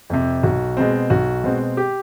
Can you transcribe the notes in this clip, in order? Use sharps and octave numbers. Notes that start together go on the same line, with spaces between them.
F2 C3
B1 F#4
B2 G#3 C4
B1 F#4
B2 G#3 C4
G4